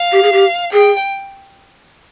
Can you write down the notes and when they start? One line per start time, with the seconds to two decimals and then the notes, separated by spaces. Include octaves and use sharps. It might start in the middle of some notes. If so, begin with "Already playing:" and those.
Already playing: F5
0.12 G4
0.23 G#4
0.32 G4
0.73 G#4 G5